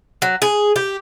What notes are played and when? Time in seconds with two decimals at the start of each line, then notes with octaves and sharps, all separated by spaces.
0.22 F#3
0.42 G#4
0.76 G4